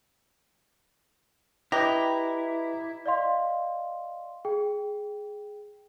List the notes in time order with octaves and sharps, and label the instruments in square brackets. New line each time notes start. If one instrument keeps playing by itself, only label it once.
[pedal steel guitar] E4 [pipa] G4 [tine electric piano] B4 D#5 A#5
[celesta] D5 D#5 F5 C6
G#4 G5